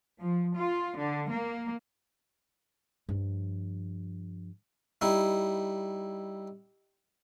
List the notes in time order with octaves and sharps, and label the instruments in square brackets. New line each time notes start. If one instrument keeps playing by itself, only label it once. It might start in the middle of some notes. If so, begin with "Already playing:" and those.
[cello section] F3
F4
D3
A#3
[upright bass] G2 F3
[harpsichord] G3 D#4 E4